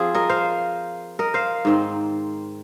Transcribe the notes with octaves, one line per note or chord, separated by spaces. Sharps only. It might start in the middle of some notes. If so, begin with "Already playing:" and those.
Already playing: F3 C4 F4 G#4
A#4 D#5
C5 F5
A#4 D#5
C5 F5
G#2 D#3 C4